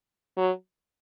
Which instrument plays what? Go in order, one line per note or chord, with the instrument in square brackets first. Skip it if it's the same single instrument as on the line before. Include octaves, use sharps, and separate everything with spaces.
[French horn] F#3